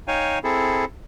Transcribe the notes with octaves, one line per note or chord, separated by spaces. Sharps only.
D#4 C#5 F5 G5 G#5
C4 E4 G#4 A4